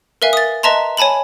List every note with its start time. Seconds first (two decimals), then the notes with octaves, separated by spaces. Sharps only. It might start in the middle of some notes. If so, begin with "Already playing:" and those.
0.22 A#4 B4 E5 F5 G#5
0.33 D#6 A6
0.63 B4 D#5 E5 A5 A#5 C6
0.97 C#5 G#5 A5 B5 F#7